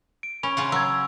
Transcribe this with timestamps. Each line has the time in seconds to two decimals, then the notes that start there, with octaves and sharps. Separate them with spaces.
0.23 D7
0.43 C#4 B5 C#6 F7
0.57 C#3 F4 F#5 C#6
0.72 F#3 E6 G#6